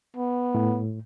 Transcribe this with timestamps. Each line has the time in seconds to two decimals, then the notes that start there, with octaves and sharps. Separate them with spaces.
0.17 B3
0.55 A2